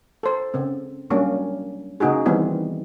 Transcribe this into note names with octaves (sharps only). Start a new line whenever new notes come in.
A4 C5
C#3 C4
F#3 G3 A#3 C#4 D4
C#3 A#3 D#4 F#4 G#4
D#3 E3 G3 B3 C4 E4